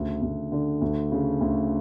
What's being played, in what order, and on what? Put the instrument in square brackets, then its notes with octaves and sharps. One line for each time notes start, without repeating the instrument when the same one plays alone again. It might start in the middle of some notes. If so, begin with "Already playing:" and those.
Already playing: [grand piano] D2 C#3
D2
D3
D2
C#3
D2